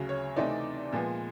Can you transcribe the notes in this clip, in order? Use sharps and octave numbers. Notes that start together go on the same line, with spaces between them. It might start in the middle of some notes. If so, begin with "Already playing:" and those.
Already playing: D2 C#3 F#3
C#5
C3 E3 A3 C4 D#4 D5
A#2 F3 G#3 B3